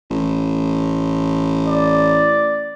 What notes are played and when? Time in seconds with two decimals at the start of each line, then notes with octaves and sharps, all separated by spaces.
0.10 A1
1.68 D5